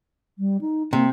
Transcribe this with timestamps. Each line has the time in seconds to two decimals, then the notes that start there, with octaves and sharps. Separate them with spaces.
0.39 G3
0.61 D#4
0.93 C3 A#3